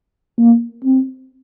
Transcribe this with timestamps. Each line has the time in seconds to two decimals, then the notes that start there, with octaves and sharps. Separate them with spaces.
0.38 A#3
0.85 C4